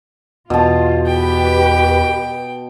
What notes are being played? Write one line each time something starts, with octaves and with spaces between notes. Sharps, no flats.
E2 B2 F4 A5
G4 B4 G5